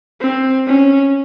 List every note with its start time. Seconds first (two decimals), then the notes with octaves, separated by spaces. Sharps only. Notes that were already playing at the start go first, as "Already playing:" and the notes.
0.20 C4
0.67 C#4